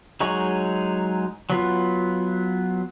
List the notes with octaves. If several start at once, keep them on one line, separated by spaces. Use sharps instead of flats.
F#3 G#3 D#4 C#6
F#3 B3 F4